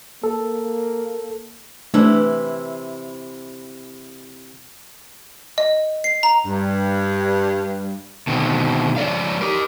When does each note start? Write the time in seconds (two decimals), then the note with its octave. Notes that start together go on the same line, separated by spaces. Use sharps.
0.24 A#3 A4
1.94 C3 E3 A3 D4 E4
5.58 D#5
6.04 C7
6.23 A#5
6.45 G2
8.27 B2 D3 D#3 C4
8.96 F3 C#5 D5 F5
9.41 G4 A#4